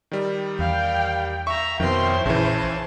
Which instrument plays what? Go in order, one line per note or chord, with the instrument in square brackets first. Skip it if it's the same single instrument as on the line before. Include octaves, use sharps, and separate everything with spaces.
[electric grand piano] D#3 G3
[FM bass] E2 [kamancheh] F5 [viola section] G5
[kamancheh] E5 A#5 [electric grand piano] C#6
[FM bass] F2 [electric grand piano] B2 D#3 [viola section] E4 C5 C#5 [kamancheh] G5 C6
[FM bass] A#1 [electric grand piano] C#3 E3 [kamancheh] A5